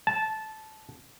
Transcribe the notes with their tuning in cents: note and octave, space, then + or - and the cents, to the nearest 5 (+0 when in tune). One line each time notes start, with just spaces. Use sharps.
A5 -15